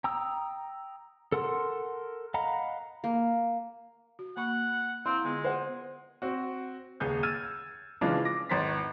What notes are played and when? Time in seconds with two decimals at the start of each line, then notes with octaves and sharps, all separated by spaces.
0.04 G5 A#5 D#6 E6
1.32 A4 A#4 F#5 C6
2.34 D#5 F5 F#5 A#5 B5
3.04 A#3
4.19 F#4
4.37 A#3 F#5 B5 C#6
5.06 C4 E4 F5 A#5 C6
5.24 D3 G#3 B3 F4
5.45 C5 F#5
6.22 C4 F#4
7.00 D#1 C#2 G#4 G6
7.23 E6 F6 G#6 A6 D#7
8.01 C#3 E3 F3 G#3 D4 F4
8.25 D6 A#6
8.49 G#1 E2 C5 A#5 A6 B6